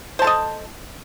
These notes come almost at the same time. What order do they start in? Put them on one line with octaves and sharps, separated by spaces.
C5 A5 A4 D#5